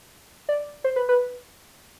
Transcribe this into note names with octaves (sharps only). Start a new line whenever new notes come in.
D5
C5
B4
B4